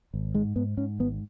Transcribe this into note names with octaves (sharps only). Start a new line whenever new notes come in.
G#1
G#2 G#3
G#2 B3
G#2 C#4
G#1 B3